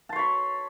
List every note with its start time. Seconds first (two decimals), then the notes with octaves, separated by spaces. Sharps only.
0.09 A5
0.13 C6
0.16 C#5
0.19 B5